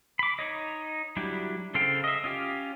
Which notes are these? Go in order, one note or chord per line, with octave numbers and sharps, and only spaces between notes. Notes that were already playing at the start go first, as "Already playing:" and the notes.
B5 D6
D#4 C#5 D#5
F#3 G3 D4 E4 G4
C#3 A4 C5 F5 G5
D#5 E5
C#4 F4 G4